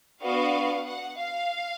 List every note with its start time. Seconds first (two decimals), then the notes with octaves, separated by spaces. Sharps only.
0.22 B3 D4 F#4 F5
0.87 F#5
1.19 F5